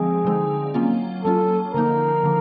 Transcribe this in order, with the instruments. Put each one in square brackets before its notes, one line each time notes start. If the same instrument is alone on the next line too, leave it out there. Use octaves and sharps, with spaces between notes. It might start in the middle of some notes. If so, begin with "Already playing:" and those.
Already playing: [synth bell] D3 F3 G#3 C4 [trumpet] G#4
[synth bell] D3 F3 G#3 C4 D#4
F#3 A#3 C#4 F4
[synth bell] F#3 A#3 C#4 F4 [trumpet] A4
[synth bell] D3 F3 A#3 D#4 [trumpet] A#4
[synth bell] D3 F3 A#3